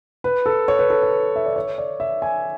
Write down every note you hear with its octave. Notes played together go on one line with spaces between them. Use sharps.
B4
A4
C#5
B4
A4
B4
E5
D5
C#5
D5
E5
G#5